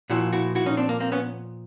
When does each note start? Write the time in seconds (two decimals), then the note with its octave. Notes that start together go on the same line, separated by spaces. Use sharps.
0.10 A#2 F3 E4 F#4
0.33 E4 F#4
0.55 E4 F#4
0.66 C#4 D#4
0.77 C4 D4
0.89 A#3
1.00 A#3 C4
1.12 B3 C#4